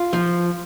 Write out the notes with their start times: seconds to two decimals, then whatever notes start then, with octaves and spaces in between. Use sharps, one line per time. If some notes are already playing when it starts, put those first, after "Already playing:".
Already playing: F4
0.13 F3